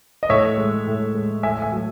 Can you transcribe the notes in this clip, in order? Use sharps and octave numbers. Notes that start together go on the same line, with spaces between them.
D#5
A2 C#5 E5
G#3
A2
G#3
A2 E5 G#5
E5 G#5
F#3 A3